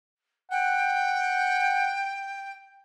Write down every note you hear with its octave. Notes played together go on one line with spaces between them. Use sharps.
F#5 G5